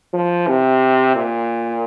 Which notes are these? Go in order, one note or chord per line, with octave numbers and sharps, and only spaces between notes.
F3
C3
A#2